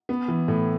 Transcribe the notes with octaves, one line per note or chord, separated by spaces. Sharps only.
B3
E3
A2